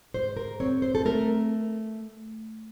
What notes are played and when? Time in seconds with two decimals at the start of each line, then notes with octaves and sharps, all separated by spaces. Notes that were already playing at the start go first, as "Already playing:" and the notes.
0.14 G#2 C5
0.37 A#4
0.60 C4 C#5
0.82 C5
0.95 A4
1.05 A3 A#4